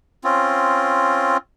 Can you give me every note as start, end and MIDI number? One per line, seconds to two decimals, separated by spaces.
0.24 1.37 60
0.24 1.37 61
0.24 1.37 65